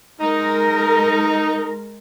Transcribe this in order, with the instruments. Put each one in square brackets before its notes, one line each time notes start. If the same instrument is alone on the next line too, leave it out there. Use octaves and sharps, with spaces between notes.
[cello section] G#3 A#4 [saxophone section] D#4